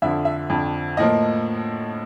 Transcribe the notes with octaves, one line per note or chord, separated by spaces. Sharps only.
F2 D3 F3 E5
E5
F2 D3 F3
A2 F3 A#3 D#5